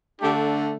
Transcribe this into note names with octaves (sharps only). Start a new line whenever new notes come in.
D3 A3 D4 G4